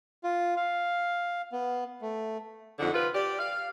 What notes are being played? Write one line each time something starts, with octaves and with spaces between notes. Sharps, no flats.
F4
F5
B3
A3
F2 D3 D#4 F#5
C3 F4 B4
G4 D5
F5